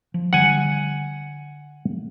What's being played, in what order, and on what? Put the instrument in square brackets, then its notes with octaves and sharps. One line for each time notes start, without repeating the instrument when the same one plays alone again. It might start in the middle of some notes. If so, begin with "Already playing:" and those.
[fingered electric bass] F3
[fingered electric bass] D3 G3 [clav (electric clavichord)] F#5 G#5